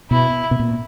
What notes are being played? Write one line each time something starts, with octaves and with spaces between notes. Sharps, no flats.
B2 E4
B2
A#2